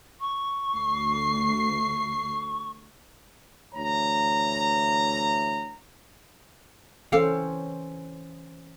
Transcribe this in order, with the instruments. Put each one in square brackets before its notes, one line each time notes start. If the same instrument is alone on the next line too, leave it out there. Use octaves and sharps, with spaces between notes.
[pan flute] C#6
[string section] D2 C7
[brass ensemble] D2 E3 C#5 A#5
[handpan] E3 C#4 C5 [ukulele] A4 F5 G5